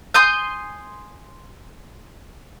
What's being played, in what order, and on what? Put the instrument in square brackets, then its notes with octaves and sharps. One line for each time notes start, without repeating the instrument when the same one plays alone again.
[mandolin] G#5 C6 D#6 G6